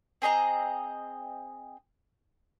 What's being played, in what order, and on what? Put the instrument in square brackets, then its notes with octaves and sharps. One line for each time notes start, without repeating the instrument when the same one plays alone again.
[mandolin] C4 G#4 D#5 A#5